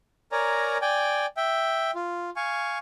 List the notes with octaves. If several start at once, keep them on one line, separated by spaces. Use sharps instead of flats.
A#4 C#5 D5 G#5 A#5
D5 G5 G#5
E5 G5
F4
F5 G#5 C#6